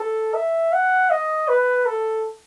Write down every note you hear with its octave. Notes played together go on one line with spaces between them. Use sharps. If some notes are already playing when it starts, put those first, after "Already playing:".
Already playing: A4
E5
F#5
D#5
B4
A4